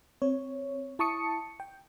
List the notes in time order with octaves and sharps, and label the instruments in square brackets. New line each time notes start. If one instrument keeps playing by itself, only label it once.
[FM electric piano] C4 C#5
E4 A5 C#6 D#6 C#7
G5